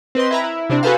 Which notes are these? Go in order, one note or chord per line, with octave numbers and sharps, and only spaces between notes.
C4 B4 D#5 C6
E4 B4 A#5
E4
C3 C4 D4
F#4 G#4 A4 B4 C5 F5